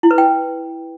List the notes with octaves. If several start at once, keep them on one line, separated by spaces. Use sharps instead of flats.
E4
B4
G5